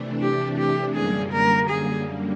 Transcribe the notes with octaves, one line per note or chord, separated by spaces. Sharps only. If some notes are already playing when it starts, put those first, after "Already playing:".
Already playing: C3 E3 A3 D4
G4
G4
F#2 D3 G3 A#3 G#4
A#4
G#4